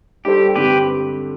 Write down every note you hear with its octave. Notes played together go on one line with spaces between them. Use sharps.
G3 D4 G4 A4 C5
G2 D3 G3 C4 G4 B4